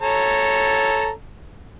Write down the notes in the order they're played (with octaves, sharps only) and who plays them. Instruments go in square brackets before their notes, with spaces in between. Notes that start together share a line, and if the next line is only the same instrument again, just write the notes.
[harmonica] A4 C#5 A#5